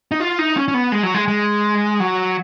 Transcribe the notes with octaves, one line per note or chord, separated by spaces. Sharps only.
D#4
F4
D#4
C#4
C#4
B3
G#3
F#3
G#3
G#3
F#3